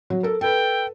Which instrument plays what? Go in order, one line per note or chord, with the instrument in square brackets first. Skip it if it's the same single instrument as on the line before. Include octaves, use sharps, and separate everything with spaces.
[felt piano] F#3
A4 A#4
[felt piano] A4 B4 [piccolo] G5